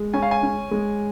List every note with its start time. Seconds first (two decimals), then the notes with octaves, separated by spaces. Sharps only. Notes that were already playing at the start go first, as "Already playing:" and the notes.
Already playing: G#3
0.14 C#4 G#5
0.22 F5
0.31 G#5
0.43 C#4
0.71 G#3